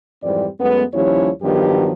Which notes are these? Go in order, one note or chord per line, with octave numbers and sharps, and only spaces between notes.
F2 G#2 E3 G3 C4 D5
F#2 G#3 A3 B3
D#2 F3 G3 C#4 E4 C#5
G2 D#3 F3 F#3 B3 G4